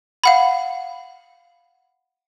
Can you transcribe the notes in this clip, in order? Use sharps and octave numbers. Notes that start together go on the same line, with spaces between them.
F5 F#5 B5